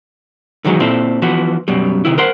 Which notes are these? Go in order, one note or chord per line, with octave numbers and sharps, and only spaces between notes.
F#2 D#3 E3 F#3 G#3
A#2 C4 E4 A4
E3 F3 B3 F#4
F#2 B2 G3
C3 D#3 E4
A#4 C5 F#5 C6